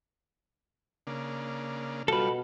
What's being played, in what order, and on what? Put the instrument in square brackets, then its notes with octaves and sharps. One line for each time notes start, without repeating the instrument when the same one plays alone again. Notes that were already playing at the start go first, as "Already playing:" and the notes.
[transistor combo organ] C#3 A#3 D4
[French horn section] B2 F#4 [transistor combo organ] G3 F4 [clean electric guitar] A4 B4